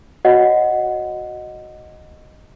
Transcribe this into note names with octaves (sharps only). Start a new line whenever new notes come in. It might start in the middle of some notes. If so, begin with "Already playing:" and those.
F#4 C#5 D#5 F#5